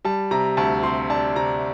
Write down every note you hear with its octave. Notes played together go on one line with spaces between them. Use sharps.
G3 A5
C3 A#5
D2 A5
C3 C6
D4 A5
C3 A#5